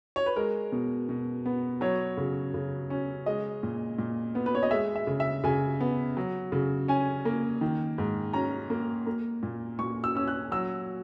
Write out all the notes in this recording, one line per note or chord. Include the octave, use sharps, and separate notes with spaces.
C#5
B4
G#3 A#4
B2
B2
B3
F#3 C#5
C#3
C#3
C#4
G#3 D#5
A#2
A#2
B3
B4
C#5
D#5
G#3 E5
E5
C#3
E5
C#3 G#5
B3
F#3
C#3
C#4 G#5
A#3
D#3
G#2
C#4 A#5
A#3
A#3
A#2
A#2 C#6
E6
C#4 E6
F#6
F#3 E6